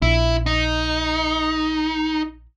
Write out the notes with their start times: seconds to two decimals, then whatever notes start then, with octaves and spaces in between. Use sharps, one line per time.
0.02 A#1 E4
0.46 D#4